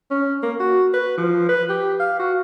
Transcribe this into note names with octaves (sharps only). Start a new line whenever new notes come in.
C#4
A#3
F#4
B4
F3
B4
G4
F5
F#4